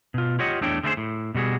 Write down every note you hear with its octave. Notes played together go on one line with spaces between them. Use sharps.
B2 F4
F4 G4 C#5 D#5 F#5
E2 A3 D4 C#5 G5
D3 A3 C4 E4 G#4 C5
A2
B2 G3 F#4 G#4